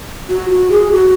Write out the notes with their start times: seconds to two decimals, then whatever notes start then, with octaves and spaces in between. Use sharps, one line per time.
0.30 F#4
0.50 F#4
0.71 G#4
0.91 F#4